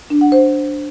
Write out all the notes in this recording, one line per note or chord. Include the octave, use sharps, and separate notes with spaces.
D4
F#5
C5